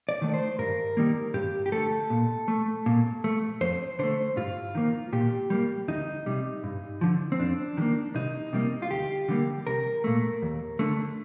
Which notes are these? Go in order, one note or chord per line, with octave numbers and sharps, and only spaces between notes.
D5
D#3 A3
C5
G2 A#4
D#3 G3 A#3
G2 G4
G4
D3 A3 A4
A#2
A3
A#2
A3
F2 C5
D3 A3 C5
G2 F4
D#3 A#3
A#2 G4
G3 A#3
D2 D#4
C3 G3
G2
D3 F3
C4
F2 D4
D#3 G3 A#3
C2 D#4
C3 G3 A#3
F4
D2 G4
D3 G3 A#3
C2 A#4
A#2 A3
D#2
D3 A3